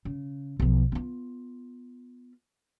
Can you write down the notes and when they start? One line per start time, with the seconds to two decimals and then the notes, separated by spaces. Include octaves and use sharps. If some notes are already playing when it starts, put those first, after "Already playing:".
0.05 C#3
0.60 B1 F3
0.92 B3 F4